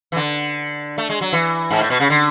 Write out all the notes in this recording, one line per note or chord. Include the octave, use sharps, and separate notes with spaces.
E3
D3
A3
G#3
F#3
E3
G#2
A2
B2
C#3
D3